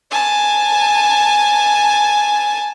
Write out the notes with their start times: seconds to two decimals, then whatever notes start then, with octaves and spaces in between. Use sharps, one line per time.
0.11 G#5 A5